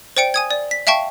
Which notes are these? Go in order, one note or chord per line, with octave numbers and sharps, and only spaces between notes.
C5 D5 G5 C#7 D7
G#5 D#6 G#6
D5
B6
E5 F5 G5 A5 C#6